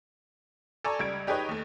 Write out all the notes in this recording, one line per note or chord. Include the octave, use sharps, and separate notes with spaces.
A4 D5 G#5 A#5 C#6
C#2 G3 G#6 D7
D#4 G4 G#4 B4 C#5 D#5
D#2 A3